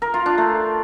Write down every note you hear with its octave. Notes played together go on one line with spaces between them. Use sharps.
A#4
F4
D4
A3